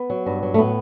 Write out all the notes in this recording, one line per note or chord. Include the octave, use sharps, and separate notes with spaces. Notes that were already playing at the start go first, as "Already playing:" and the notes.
Already playing: B3
F#3
G2
F#3
A3
A2 B3